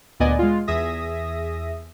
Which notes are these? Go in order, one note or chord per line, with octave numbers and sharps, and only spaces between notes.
D2 A#2 B3 D5 D#5 G#5
G#3 F4
E2 G#4 E5 D#6 A#6